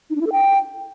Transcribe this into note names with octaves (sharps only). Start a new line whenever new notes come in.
D#4
D4
E4
A4
G5